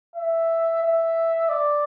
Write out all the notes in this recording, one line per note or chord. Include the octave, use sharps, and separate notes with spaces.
E5
E5
D5